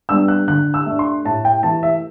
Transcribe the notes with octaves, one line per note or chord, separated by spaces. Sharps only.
G3 B3 D4 E6
F#6
D3 F#6
E6
A3 D4
C6
A2 A5
G5
E3 A3 A5
E5